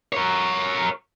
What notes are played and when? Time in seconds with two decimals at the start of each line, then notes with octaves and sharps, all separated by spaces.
0.13 A#4 C#5